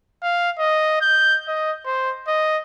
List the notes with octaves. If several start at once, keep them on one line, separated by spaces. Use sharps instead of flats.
F5
D#5
G6
D#5
C5
D#5